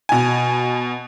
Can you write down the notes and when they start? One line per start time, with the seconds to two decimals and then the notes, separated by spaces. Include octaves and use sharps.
0.09 B2 G#5